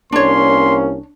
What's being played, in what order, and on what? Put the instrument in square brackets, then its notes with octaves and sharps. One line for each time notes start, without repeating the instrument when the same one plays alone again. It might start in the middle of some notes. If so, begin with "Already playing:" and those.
[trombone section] C2 A#3 C#4 [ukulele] D4 C#5 [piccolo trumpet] C6